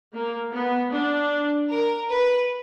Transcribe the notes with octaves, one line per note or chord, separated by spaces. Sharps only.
A#3
B3
D4
A#4
B4